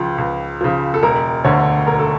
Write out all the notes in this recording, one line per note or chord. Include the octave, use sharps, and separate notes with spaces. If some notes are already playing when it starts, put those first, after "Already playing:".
Already playing: C#2 C#3 F3
C#2
C#3 F3
A4
E1 A#4
D2 D3 C#5
E1 A#4
A4